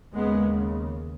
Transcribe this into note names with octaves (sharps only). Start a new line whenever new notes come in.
D#2 C#3 G#3 B3